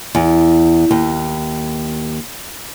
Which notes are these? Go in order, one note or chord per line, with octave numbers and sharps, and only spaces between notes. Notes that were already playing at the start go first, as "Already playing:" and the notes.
E2
D#2